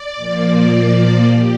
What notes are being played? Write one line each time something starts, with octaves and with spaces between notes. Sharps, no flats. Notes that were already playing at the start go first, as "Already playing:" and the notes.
Already playing: D5
A#2 F3 A#3
G4